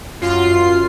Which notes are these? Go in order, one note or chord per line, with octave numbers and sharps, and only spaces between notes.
F#2 F4 C7